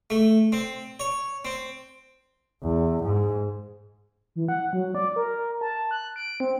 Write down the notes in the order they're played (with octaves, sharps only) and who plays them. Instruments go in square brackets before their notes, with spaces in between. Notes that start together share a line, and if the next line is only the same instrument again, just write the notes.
[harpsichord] A3
C4
C#5
C4
[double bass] E2
G#2
[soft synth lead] E3
F#5
F#3
D5
A#4
A5
F#6
D7
C4